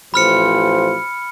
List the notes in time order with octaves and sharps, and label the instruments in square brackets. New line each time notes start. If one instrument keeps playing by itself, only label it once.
[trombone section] A1 F3 C5 [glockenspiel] B5 F6 C#7